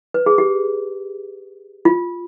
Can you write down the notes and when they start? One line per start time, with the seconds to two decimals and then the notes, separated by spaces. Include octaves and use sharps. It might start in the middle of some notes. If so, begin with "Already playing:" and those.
0.14 B4
0.26 G#4
0.38 G4
1.85 F4